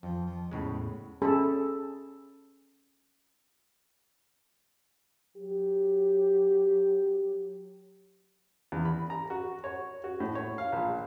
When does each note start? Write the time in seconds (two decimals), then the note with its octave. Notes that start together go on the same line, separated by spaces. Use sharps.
0.03 F2 F3
0.26 F3
0.51 E2 A2 C#3 G#3
1.22 C#4 G#4 A4 B5
5.37 F#3 G4
8.72 E2
8.85 B5
9.10 A#5
9.30 F#4
9.64 C#5
10.04 F#4
10.20 A2
10.35 C#5
10.58 F5
10.72 A#1